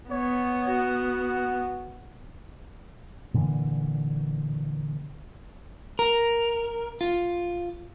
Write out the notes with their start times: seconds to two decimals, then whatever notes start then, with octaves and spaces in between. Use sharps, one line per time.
0.11 B3 C#5
0.67 F#4
3.34 A#2 D3 E3
5.99 A#4
7.01 F4